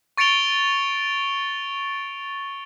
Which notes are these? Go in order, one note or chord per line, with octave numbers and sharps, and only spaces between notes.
C#6 A6 C#7 D7 F7 G7